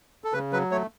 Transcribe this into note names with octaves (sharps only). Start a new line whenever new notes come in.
A4
C#3 B4
F#3 B4
A3 C#5